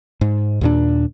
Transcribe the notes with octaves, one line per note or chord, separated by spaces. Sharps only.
G#2
D#2 A#2 D4